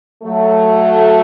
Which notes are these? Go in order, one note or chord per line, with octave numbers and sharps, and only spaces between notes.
F#3 A3